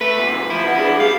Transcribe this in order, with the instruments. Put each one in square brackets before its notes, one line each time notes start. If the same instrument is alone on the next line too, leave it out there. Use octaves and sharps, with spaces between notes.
[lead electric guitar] A3 [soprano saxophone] B4
[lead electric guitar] D2 A#2
[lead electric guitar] F3 [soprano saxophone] E4
[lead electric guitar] F#4 B4
[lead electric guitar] B3 D4 [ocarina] G#4
[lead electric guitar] G3 [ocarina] G#4 [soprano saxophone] F5